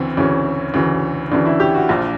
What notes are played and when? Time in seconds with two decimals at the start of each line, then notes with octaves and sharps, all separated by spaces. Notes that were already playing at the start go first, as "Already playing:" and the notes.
Already playing: D2 C#3 E3 C4
0.17 D2 C#3 E3 C#4
0.74 D2 C#3 E3
1.31 D2 C#3 E3 D4
1.46 E4
1.60 G4
1.74 F#4
1.89 A#1 A#2 F3 F4